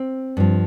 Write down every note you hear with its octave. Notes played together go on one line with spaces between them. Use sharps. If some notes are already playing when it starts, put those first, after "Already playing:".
Already playing: C4
G2 F3